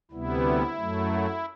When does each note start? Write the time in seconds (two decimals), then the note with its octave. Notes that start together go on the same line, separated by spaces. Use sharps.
0.11 D2 C3 G3 B3 E4
0.75 F#2 F#3 A3